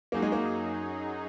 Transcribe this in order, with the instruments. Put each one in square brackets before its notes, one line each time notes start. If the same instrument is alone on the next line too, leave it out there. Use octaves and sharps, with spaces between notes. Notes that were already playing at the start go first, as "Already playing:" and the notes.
[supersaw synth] F#2 F#3 D#4 G#4 [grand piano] A#3
[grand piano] G#3
A#3